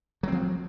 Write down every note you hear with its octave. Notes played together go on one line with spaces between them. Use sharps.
F3 F#3 C4